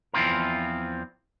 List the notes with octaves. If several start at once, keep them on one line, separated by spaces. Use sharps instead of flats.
E2 E3 F3 C4 F4 A#4